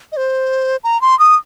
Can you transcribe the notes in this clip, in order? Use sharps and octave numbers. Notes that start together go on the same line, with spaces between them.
D#5
C5
A#5
C6
D#6